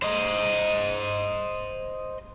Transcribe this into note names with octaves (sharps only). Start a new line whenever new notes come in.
C5 D#5